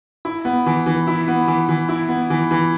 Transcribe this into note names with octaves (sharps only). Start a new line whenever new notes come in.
E4
B3
E3
E3
E4
B3
E3
E3
E4
B3
E3
E3